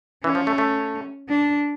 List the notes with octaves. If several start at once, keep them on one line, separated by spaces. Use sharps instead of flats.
E3 C#4
F3
A3
A3
D4